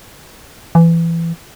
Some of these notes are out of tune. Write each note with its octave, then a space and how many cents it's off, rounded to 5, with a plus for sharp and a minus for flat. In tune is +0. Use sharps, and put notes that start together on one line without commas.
E3 +20